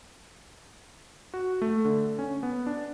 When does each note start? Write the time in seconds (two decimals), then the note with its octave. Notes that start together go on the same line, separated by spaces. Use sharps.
1.34 F#4
1.62 A3
1.85 D3
2.19 C#4
2.43 B3
2.67 D4